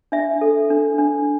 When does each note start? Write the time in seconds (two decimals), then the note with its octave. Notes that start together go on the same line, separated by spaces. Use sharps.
0.12 D4 E5
0.41 A4
0.70 D4
0.98 D4